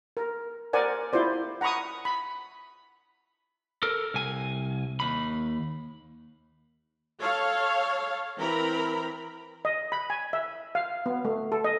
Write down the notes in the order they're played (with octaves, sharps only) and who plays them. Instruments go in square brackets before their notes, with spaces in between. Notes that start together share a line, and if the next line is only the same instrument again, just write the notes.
[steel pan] A#4
A#4 C5 D5 F#5 G#5
E4 F4 C5 D5
F#5 A#5 B5 C#6 D#6
B5
[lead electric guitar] A4 A#4
C2 G#5
D#2 B5
[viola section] A4 C#5 F5
E3 C4 A#4 A#5 B5
[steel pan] D#5
B5
G#5
E5
F5
B3
A3
A4
D#5